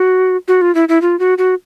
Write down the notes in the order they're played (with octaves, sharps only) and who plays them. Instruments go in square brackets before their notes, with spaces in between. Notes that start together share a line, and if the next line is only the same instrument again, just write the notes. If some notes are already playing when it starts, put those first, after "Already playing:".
Already playing: [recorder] F#4
F#4
F4
E4
E4
F4
F#4
F#4